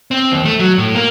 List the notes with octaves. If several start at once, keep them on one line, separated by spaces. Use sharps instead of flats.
C4
D#2
A3
F#3
A2
A#3